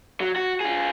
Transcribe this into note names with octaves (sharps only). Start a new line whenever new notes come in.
F#3
F#4
F4 G#4